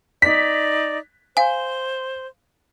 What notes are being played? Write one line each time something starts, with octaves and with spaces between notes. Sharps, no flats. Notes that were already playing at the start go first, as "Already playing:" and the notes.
D#4 D5 B6
C5 F5 G#5